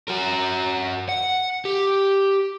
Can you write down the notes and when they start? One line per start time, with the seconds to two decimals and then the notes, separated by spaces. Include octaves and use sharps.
0.08 F#4 A#4
1.09 F#5
1.65 G4